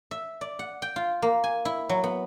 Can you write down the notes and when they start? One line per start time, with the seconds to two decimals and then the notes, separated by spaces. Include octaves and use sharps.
0.11 E5
0.41 D5
0.59 F#5
0.82 G5
0.96 F4
1.22 A#3
1.44 G#5
1.65 E4
1.89 F#3
2.04 B3